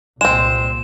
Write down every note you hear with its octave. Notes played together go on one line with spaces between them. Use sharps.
C2 A#2 G#3 C4 E7